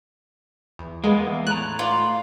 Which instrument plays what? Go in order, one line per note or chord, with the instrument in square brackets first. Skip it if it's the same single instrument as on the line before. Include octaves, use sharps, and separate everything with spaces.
[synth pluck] E2
[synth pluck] G#3 [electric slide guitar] A#3 B3
[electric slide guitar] E2
[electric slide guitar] A2 A#5 [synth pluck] F#6
[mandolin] F4 D5